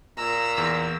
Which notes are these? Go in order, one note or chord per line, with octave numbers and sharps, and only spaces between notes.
A#2 A#5 E6
E2